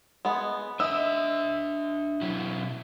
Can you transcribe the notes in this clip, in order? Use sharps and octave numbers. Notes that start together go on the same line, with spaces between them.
G#3 B3
D4 D#5 E5 E6
B2 F#3 E4